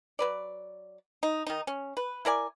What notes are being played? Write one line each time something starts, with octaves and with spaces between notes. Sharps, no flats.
F#3 B4 D5
D#4
D#3 D#4
C#4
B4
E4 A#4 D5 G#5